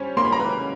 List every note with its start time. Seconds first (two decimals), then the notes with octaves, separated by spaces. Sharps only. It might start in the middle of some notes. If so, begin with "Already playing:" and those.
Already playing: G3 C#4 C5
0.17 A#3 C6
0.25 B5
0.32 A#5
0.39 B4 B5